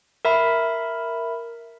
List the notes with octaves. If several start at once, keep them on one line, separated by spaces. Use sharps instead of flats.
A#4 E5 B5